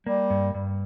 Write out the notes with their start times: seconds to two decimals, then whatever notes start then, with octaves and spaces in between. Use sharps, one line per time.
0.06 G3 A#3
0.30 G2
0.55 G2